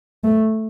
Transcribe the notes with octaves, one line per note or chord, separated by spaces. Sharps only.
A3